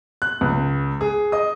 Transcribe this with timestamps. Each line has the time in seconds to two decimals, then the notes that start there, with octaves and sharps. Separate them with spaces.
0.22 F#6
0.41 C#2
1.01 G#4
1.32 D#5 D#6